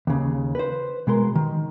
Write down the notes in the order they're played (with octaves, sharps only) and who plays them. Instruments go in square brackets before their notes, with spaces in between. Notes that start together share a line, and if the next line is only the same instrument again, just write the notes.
[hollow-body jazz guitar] D#2 C#3
B4 C5
B2 G#3 A#4 C6
D#3